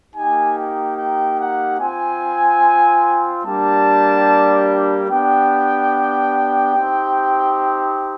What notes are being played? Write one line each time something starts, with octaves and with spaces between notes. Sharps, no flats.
A#3 D#4 G4 G#5
G5
G5
F#5
C4 F4 G#5
G3 A#3 D4 G4 A5
B3 D4 G4 G5
C4 D#4 G4